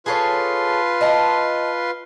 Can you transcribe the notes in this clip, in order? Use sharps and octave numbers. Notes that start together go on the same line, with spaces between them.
F4 G#4 A4 B4 C#5 C6
D#5 F5 A5